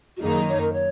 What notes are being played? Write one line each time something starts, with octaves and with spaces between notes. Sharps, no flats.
F#4
F#2 D#3 F#3 A#3 D#4 G#4
C#5
A#4
C#5